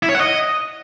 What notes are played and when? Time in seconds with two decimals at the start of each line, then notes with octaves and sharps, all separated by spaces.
0.03 E4
0.09 C#5
0.15 F#5
0.21 D#5